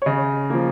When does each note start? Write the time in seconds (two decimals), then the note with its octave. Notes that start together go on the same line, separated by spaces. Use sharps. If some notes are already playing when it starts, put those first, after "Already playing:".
0.02 C#5
0.06 C#3 D#5
0.50 F3 A#3